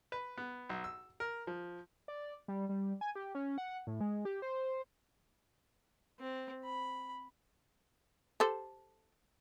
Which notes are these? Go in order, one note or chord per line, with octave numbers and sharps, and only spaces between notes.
B4
B3
B1
E6
A#4
F3
D5
G3
G3
G#5
G4
C#4
F#5
A2
G#3
G4
C5
C4
B5
G4 A4 C5